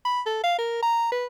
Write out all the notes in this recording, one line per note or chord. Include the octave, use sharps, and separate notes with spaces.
B5
A4
F5
A#4
A#5
B4